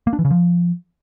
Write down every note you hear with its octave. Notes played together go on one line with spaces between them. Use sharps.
A#3
D4
E3
C#3
F3